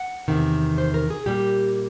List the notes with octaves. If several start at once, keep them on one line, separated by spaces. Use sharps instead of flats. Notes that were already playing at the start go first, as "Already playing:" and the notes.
Already playing: F#5
E2 C3 D#3
C5
A#4
G#4
A#2 G3 A#3 G4